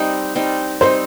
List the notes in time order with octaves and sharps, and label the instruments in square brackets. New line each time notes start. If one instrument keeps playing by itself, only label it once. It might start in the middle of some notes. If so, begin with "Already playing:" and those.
Already playing: [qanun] G3 C4 D#4
G3 C4 D#4
[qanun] G3 C4 D#4 [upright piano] C5